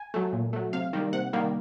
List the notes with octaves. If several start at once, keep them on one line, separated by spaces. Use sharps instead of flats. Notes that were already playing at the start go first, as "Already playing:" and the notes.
Already playing: G#5
F#3 A3
A#2
F#3 A3
C3 F5
D#3 G3 A#3
C3 F#5
D#3 G3 A#3